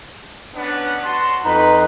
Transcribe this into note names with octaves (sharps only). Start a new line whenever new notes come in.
B3 C#4 D4
F#4 A5 C6
F2 D#4 B4